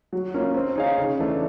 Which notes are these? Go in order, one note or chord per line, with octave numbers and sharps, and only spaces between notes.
F#3
A#3 C#4 F4
C4
D#4 G#4 C#5 F5
C#3
E3 A3 D4